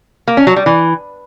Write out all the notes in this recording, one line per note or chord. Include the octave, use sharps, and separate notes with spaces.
A#3
C#4
F#3
G3
E3